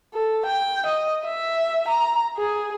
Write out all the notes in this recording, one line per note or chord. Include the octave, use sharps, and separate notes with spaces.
A4
G5
D#5
E5
A#5
G#4